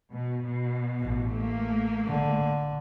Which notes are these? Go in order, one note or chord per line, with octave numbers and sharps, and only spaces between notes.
B2
B2
A1
A3 A#3
D3